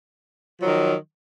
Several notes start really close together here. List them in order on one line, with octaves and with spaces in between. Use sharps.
F3 F#3 D#3